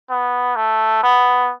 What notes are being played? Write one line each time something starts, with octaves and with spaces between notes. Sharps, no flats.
B3
A3
B3